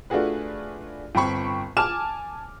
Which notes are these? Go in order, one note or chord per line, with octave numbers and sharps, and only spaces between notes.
A3 D4 F4 F#4 G#4 B4
G1 C4 G5 B5 C#6
G#5 A5 D6 F6 E7